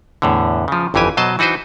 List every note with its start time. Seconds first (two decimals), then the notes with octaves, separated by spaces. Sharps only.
0.22 E2 A2 D3
0.68 C#3 F3
0.94 G1 F2 E3 G4 G#5
1.17 B2 F#3 C5 D#5 A5
1.39 E3 D#4 F#4 B4 C5